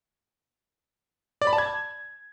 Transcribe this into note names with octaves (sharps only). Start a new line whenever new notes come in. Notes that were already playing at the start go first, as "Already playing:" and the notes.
D5
B5
A5
G#6